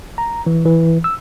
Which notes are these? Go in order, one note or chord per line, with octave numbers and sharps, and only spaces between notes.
A#5
E3
E3
E6